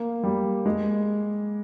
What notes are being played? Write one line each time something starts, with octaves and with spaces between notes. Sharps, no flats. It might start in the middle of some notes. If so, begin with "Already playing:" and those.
Already playing: A#3
G3
G#3